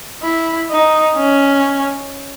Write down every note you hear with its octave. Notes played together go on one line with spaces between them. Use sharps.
E4
D#4
C#4